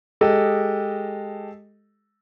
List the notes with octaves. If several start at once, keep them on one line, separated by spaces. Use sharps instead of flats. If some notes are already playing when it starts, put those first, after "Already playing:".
G#3 G4 A4 D#5